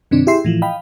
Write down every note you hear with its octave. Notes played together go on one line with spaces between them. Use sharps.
G2 C3 D#3 C4 D4
E4 G4 G#4 E5 C6 C7
A2 E3 F3
D#5 F5 G5 B5